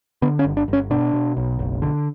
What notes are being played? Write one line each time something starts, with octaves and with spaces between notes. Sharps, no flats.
D3 B3
C#4
G1
D4
G1
C#4
B2 D4
B2
B1
F#1
D3